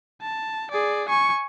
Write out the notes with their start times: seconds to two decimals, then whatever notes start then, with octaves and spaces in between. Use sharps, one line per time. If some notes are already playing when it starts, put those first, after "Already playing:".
0.22 A5
0.71 G#4 D5
1.09 G#5 C#6